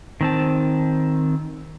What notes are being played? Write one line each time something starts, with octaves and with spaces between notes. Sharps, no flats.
D#3 C4 A5